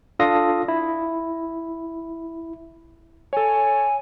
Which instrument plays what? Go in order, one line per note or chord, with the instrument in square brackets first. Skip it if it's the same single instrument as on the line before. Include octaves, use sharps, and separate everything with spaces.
[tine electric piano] D4 F4 A4 F5 D#6 A#6
E4
[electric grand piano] A4 C#5 [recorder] G#5